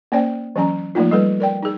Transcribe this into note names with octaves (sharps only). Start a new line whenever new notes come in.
A#3 C#4 C5 D5 G5
E3 F#3 C#4 A#5
F3 A3 A#3 D#4 F4
G3 A4 B4
A#4 D5 G5
D#4 G#4